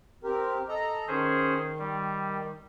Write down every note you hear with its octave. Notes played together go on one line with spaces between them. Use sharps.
C4 G4 A#4
A4 D#5 A#5
D#3 C#4 G#4 C5
G3